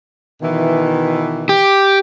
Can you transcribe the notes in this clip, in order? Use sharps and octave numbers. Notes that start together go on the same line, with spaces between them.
B2 D#3 E3
G4